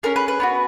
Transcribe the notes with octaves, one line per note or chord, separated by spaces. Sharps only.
C#4 G#4 A#4
B4
B4
B3 D#4 F#4